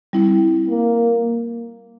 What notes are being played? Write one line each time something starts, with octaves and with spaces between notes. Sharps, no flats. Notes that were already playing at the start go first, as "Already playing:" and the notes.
G3 C4 E4
A#3